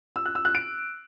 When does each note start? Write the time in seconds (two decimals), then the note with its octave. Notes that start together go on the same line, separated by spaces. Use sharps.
0.16 E6
0.25 F#6
0.35 E6
0.45 F#6
0.55 D7